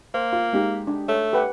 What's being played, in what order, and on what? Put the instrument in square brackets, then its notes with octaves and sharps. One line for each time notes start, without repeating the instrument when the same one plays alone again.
[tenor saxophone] A#3 [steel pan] C5
[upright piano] F4
G#3 D#4 G4
[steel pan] D4
[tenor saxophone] A3 [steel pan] C#5
[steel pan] G4 B4 F#5